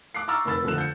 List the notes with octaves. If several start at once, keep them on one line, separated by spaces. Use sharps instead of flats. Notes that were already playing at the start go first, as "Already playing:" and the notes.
D6 F#6 C7
A#5 C#6 D6 E6 F6 A6
F1 A#4 B5 E6 A6
D#1 F2 D3 A3 F#6 E7
G6 C#7